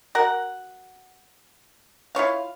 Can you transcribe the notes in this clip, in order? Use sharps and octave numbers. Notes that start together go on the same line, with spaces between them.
F#4 A#4 F#5
E4 F4 C#5 F5